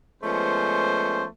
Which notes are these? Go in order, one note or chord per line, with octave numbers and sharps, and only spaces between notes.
F3 G#3 A3 B3 C#4 C5